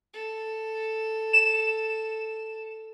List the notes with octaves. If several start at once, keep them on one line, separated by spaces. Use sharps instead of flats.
A4
E7